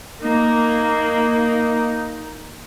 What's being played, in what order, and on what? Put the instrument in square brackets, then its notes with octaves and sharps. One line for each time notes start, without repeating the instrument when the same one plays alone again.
[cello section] A#3 [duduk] D#4